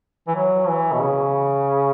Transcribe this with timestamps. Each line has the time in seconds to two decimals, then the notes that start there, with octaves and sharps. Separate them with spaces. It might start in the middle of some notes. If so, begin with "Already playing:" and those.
0.27 E3
0.35 F#3
0.68 E3
0.93 B2
1.00 C#3